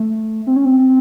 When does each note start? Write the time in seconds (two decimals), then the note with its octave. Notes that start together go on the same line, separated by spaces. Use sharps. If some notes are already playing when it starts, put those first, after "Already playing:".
Already playing: A3
0.47 C4
0.56 C#4
0.65 C4